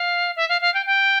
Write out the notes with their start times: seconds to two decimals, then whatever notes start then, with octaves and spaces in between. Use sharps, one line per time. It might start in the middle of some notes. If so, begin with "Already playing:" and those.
Already playing: F5
0.36 E5
0.49 F5
0.61 F5
0.74 G5
0.86 G5